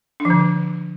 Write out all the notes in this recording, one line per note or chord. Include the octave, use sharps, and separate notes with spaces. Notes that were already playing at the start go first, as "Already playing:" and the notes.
D4
F3
D3